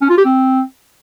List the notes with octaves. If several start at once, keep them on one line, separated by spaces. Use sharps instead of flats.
C#4
F4
G4
C4